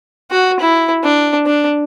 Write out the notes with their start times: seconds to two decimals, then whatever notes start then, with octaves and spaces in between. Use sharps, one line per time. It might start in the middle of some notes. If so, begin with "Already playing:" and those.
0.31 F#4
0.60 E4
1.04 D4
1.46 D4